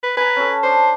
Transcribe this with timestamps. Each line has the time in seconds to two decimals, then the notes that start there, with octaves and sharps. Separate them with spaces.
0.03 B4
0.17 B4 G#5 A#5
0.36 C#4 A4
0.63 D4 C5